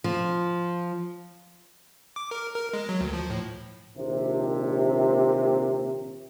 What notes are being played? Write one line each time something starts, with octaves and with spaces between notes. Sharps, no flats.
F3
D6
A#4
A#4
G#3
F#3
D2
F3
A2
A#1 D#2 C3